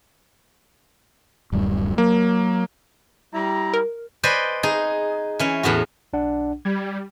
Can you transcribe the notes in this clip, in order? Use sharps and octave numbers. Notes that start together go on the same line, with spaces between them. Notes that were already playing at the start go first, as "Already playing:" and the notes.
D1 F#2 G3
F#3 A#3
G3 E4 A#5
A#4
B4 C5 D5 D#5 G#5
D#4 G#4
E3 C#4
E2 A2 B3 F#4
B1 D4 F#5
G3 G#6